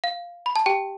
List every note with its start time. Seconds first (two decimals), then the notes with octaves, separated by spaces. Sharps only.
0.04 F5
0.46 B5
0.56 A5
0.66 G4 G5